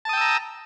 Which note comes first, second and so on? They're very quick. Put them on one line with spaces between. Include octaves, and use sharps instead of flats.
A5 D#6 G5 E6 A#5